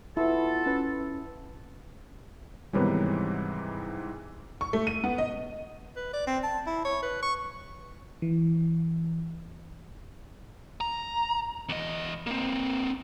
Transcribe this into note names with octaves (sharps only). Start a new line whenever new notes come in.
B3 E4 F4 A4
C#4 B4
G#2 C3 D#3 E3 G3 B3 C#5
C#6
A3
D#7
B3
D#5
B4
D5
C4
A5
E4
C#5
B4
C#6
E3
A#5
E2 D#5
A#3 C4